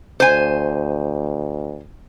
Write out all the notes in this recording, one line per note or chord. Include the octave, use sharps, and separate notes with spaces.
D2 C5 G#5